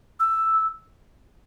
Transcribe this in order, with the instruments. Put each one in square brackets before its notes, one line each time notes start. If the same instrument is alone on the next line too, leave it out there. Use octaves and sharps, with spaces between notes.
[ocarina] E6